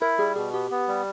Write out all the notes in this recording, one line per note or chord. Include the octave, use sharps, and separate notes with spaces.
E4 A#4
G3 G#4
B2 G#4
B3 G4
B3
G3